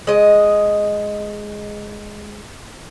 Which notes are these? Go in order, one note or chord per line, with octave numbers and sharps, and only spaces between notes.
G#3 D#5